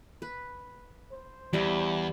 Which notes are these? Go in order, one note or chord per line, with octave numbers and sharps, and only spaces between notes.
B4
C5
E2 G3 E5